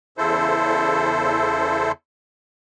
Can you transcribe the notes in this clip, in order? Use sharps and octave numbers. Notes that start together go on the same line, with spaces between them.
E2 C#3 E4 A4 C5